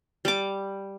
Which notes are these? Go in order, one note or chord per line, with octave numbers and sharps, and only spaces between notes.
G3 D6